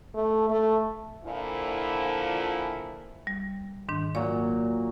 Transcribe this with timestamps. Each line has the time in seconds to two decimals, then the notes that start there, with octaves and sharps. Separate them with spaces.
0.15 A3
0.50 A3
1.24 A#2 D3 F3 E4
3.27 G3
3.89 G#2 D#3 D4
4.15 A#2 F#3 C#5